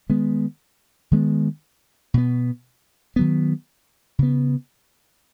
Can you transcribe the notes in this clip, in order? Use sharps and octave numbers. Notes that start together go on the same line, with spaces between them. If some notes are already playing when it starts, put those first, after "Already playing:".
D#3 G#3 B3
D#3 G#3 B3
B2 B3
D#3 F#3 B3
C#3 B3